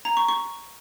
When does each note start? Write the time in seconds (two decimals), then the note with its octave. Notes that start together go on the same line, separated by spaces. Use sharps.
0.05 A#5
0.17 C#6
0.28 C#6